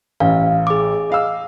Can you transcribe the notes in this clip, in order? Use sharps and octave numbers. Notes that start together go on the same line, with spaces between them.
A1 F5
G#4 D6
D#5 F5 E6